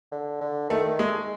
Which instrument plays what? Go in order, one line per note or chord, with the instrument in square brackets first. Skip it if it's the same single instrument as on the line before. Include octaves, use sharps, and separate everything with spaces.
[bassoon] D3
D3
[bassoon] D#3 [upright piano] A3
[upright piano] G#3
[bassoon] A3
G#3